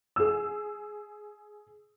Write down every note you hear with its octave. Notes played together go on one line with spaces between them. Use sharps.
G#4 E6